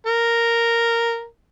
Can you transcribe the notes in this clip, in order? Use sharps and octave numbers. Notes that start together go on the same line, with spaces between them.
A#4